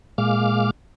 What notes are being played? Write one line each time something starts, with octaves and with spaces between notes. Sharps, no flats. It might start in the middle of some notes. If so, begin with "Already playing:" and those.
A#2 G#3 F5 D6 F6